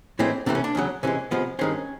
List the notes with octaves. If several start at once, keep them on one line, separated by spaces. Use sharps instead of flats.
A2 E3 G#3 C4
C3 E3 A3 C4 D4
C#4
D4
E2 C#3 F#3
C3 E3 G#3 C#4
C3 F3 G#3 B3
G2 D#3 G#3 C4 C#4